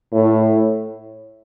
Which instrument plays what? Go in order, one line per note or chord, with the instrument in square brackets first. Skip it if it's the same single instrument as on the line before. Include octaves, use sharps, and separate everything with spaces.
[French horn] A2